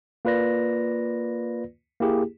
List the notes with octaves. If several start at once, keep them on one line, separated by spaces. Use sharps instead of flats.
A#3 F4 B4 D5 A#6
A#3 E4 G4 G#4